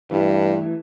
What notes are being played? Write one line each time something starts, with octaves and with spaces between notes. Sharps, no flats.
G2 E3 A3